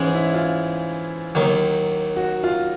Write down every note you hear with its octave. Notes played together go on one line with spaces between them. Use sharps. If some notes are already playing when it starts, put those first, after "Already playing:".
Already playing: G#2 E3 G#3 C#4
E4
F4
D#2 D#3 F#3
F#4
F4